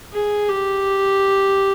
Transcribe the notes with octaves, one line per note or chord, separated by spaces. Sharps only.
G#4
G4